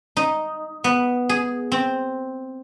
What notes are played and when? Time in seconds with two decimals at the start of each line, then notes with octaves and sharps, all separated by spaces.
0.17 D#4
0.84 B3
1.29 G#4
1.72 C4